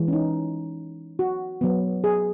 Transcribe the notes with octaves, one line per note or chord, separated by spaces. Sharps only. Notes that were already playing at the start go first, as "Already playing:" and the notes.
Already playing: E3 G#3
C#4
D#4
F#4
F#3 B3
G#4